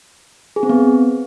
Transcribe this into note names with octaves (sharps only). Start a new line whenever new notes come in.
G#4
C4
B3